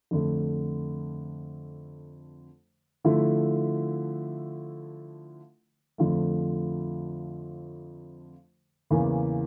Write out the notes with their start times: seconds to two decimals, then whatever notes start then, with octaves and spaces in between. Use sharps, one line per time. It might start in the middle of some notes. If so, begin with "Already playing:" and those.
0.11 F2 D3 A3
3.04 D3 F3 A3 E4
5.98 F2 D3 F3 A3
8.91 E2 C#3 E3 A#3